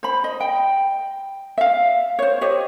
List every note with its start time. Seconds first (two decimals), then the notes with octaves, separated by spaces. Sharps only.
0.03 C5 B5
0.24 D#5
0.40 G5
1.58 E5 F5
2.19 C5 C#5
2.41 G4 C5 C#5 D#5